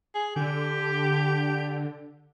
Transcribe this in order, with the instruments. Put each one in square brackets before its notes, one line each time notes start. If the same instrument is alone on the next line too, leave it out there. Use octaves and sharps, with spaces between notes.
[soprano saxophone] G#4
[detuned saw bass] D3 [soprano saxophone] G4